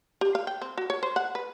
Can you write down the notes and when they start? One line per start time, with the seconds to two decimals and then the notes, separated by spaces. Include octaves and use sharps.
0.21 G4
0.35 F5
0.47 G5
0.61 C4
0.78 F#4
0.90 C#5
1.03 C5
1.16 F#5
1.35 B4